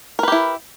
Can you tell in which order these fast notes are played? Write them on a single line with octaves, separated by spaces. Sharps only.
A#4 B4 G4 E4